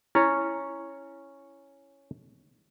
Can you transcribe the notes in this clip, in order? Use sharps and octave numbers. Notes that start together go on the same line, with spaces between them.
C#4 E4 C#5